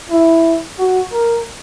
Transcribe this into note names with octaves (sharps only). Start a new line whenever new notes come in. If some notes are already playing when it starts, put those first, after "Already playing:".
E4
F#4
A#4